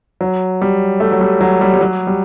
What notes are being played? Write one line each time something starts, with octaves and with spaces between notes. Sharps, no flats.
F#3
G3
A3
F#3
G3
F#3
G3
G3
F#3
G3